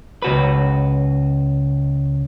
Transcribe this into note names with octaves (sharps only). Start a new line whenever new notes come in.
C#2 F#4 B4